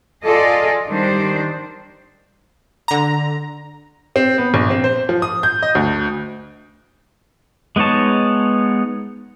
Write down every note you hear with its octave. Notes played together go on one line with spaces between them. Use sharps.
F4 G#4 A4 D5 D#5
D#3 G3 D4 C5
D3 A#5
C4
B3
A#1
C4
C5
F3
D#6
G6
D#5
D2
G#3 B3 D#4 C#5 A5